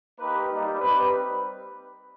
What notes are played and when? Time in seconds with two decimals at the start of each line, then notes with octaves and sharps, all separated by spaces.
0.18 A#3 D#4 G4 B4
0.49 G3 A#3 D#4
0.79 G3 C4 D#4 G4 B4